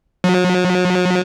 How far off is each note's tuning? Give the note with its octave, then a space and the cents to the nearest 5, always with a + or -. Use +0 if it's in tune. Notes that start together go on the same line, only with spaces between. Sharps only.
F#3 -40